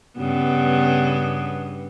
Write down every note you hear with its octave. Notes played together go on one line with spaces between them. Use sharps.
G2 C#3 B3